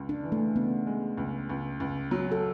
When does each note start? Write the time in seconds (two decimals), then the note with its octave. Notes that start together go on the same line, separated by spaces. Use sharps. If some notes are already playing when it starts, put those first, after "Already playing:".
Already playing: C#2 G#3
0.09 D4
0.24 E3
0.32 A3
0.55 C#3 B3
0.87 G#3
1.18 C#2
1.49 C#2
1.80 C#2
2.11 F#3
2.32 A4